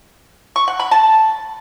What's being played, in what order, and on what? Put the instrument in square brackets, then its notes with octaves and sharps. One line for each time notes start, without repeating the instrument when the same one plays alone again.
[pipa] C#6
F#5
B5
A5